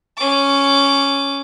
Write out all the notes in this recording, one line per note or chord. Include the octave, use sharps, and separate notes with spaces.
C#4 D6